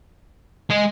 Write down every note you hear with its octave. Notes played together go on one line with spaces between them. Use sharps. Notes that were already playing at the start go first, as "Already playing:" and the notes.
G#3